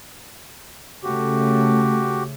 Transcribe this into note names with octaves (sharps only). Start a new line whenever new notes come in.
C#3 A3 F#4 G4